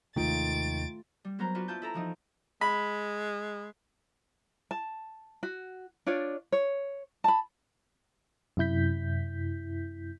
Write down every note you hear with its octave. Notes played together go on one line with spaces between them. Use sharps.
D#2 C3 D#3 G#3 A3 F4 A6 D7
G3
F#3 B3 A#4 C5 A#5
D4 F4 F#4 B4
E4 F4 A5 G6
E4 A4 A#5
E3 F3 D#4
G#3 B5
A5
F#4
D4 F4 C#5 D5
C#5
A5 B5
F#2 C3 E4 G6 B6